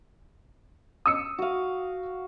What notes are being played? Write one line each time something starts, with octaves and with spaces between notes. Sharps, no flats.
D#6 E6 C#7
F#4 F5